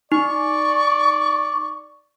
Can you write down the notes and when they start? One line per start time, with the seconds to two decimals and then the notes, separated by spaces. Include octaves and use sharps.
0.12 D#4 D5 C#6